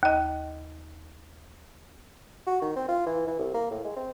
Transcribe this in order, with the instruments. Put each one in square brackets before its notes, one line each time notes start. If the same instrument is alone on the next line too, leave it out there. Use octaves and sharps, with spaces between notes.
[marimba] D#2 D#5
[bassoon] F#4
D#3
C4
F4
E3
E3
C2
A#3
A2
G#3
C4